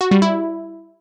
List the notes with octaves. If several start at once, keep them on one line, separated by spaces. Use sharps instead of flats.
F#4
G3
E4